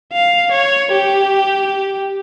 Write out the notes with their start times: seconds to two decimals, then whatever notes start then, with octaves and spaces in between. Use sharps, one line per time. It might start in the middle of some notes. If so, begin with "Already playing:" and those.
0.13 F5
0.52 C#5
0.92 G4